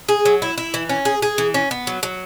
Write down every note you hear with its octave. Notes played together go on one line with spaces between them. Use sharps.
G#4
F#3
E4
E4
E3
C#4
G#4
G#4
E3
C#4
B3
F#3
F#3